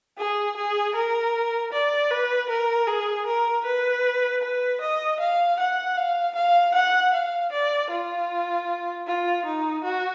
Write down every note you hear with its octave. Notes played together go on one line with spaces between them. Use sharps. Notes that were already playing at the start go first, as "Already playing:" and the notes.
G#4
G#4
A#4
D5
B4
A#4
G#4
A#4
B4
B4
D#5
F5
F#5
F5
F5
F#5
F5
D5
F4
F4
D#4
F#4